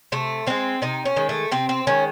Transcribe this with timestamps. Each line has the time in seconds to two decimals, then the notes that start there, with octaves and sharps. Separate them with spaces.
0.12 C3 A3
0.47 D#3 G#3 C4
0.82 C3 D#4
1.05 C#4
1.16 D#3 G#3
1.29 A3
1.52 C3 C4
1.69 C4
1.87 D#3 G#3 C#4